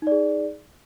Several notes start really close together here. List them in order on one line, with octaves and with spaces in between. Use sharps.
D#4 D5 G#4